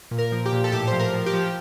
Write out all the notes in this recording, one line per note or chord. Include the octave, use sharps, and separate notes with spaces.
A#2
A#4
F3
G4
A#2
A4
A2 G4
F3 C5
A#4
F3
G4
F3